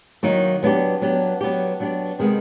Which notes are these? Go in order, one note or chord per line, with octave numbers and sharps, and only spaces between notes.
D#3 F#3 A#3 D#4
F#3 B3 D4 G4
F#3 B3 D4 G4
F#3 B3 D4 G4
F#3 B3 D4 G4
C3 D#3 G#3 B3